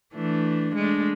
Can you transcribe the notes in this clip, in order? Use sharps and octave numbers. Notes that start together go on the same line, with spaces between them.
E3 A3 D4
G#3 A3 D4